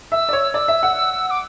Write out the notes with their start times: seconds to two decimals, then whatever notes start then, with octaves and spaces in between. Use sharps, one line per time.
0.12 E5 E6
0.29 D5
0.33 C#5
0.54 D5 E6
0.68 E5
0.83 F#5
1.30 D6